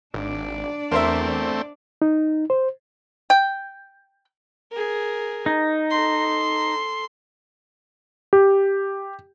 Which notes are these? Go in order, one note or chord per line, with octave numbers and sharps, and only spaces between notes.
G#1 D4 D5
E2 A3 C4 A#4 C5 E5
D#4
C5
G5
G#4 A#4
D#4
A4 C6
G4